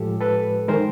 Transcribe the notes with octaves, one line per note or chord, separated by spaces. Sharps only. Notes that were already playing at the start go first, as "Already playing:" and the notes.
Already playing: A2 F3 G#3 G4 A4
A4 B4
D#3 G#3 A#4 C5